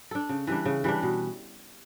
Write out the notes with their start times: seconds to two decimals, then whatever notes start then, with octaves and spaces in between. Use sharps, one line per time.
0.11 D4 A4
0.29 C#3
0.47 E3 G3 D4
0.65 C#3
0.84 E3 G3 D4
1.03 B2